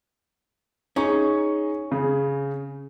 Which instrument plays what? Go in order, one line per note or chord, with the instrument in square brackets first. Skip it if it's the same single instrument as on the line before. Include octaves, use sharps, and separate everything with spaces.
[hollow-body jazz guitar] C#4 [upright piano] D#4 G#4 C#6
[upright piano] C#3 G#4